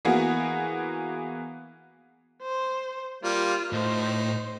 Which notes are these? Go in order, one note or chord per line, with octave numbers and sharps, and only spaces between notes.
E3 A#3 B3 F#4 G#4
C5
G3 A#3 F4
A2 D#4 C5